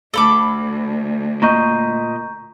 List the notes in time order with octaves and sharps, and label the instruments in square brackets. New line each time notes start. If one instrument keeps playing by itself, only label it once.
[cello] D2 [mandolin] A4 B5 D6
[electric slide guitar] A#2 A#3 D#5 [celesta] A#5 C#6 G6